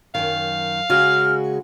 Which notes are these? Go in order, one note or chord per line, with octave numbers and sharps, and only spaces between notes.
F#2 D#3 F5
C#3 G#3 F#4 F6